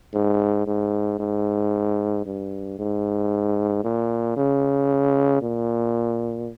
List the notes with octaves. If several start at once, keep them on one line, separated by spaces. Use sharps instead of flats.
G#2
G#2
G#2
G2
G#2
A#2
C#3
A#2